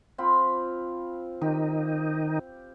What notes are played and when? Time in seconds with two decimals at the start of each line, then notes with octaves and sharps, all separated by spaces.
0.18 C4 F4 B5
1.42 D#3 D#4 G4